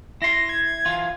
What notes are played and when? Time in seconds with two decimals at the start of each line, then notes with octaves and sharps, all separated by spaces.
0.22 E4 C6 A#6
0.49 G#6
0.86 E3 F4